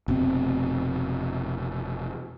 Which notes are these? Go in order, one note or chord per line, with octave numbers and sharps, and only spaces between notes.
F1 B2 C4